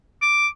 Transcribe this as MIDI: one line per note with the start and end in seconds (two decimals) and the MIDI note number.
0.22 0.48 86